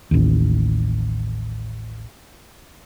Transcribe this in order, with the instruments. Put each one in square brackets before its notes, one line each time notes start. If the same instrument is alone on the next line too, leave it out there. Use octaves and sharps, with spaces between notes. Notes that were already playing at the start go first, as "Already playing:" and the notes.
[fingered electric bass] A1 D#2